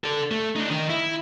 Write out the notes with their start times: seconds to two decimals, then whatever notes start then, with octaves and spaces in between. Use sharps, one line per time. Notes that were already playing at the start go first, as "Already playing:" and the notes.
0.04 A4 D5
0.31 A3
0.56 D4 D#4
0.70 D#3 D#4
0.89 E4